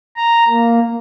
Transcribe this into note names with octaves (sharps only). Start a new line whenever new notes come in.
A#5
A#3